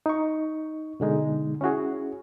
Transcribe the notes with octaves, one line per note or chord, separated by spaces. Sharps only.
D#4 C#6
B2 D3 G#3 D#4
C#4 E4 F#4 G#4